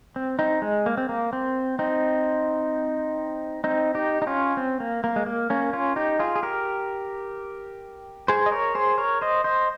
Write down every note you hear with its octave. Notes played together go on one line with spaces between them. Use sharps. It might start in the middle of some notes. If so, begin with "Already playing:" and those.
C4
C4 D#4
G#3
A#3
C4
A#3
C4
C4 D#4
C4 D#4
D#4 G4
D#4
C#4 F4
C4
A#3
A#3
G#3
A#3
A#3 C#4
C#4 F4
D#4 G4
F4 G#4
G#4
G4 A#4
G#4 C5
D#5
A#4 C#5
G#4 C5
A#4 C#5
C5 D#5
C5 D#5